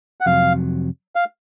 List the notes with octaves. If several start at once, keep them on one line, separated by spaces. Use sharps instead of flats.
F#5
F2 C3 F#3 F5
F5